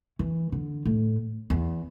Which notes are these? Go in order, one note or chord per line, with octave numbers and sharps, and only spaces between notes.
E3
D3
A2
E2